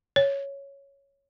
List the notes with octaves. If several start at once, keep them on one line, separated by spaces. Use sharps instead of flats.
C#5